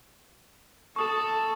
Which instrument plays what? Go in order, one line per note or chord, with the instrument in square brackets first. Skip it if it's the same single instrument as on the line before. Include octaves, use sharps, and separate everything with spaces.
[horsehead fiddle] A4 [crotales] C#6 D#6 E7